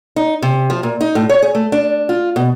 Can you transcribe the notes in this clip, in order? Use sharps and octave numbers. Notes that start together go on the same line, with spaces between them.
D#4
C3
F3
A#2
D#4
A2
C#5
G#4
A3
D4
F4
B2